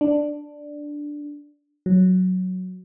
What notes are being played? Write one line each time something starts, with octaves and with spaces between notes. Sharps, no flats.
D4
F#3